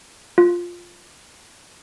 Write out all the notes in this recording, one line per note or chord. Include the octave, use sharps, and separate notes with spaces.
F4